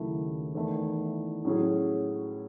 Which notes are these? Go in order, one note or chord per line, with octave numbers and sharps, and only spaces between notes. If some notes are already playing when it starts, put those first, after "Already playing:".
Already playing: D#2 C#3 F#3 A3 E4
E2 D#3 A3 E4
A2 F#3 C#4 G#4